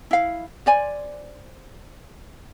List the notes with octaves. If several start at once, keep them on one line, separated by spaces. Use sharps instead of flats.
E4 F5
C5 D5 G#5